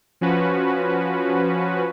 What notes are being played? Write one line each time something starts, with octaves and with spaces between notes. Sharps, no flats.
F3 C#4 F#4 B4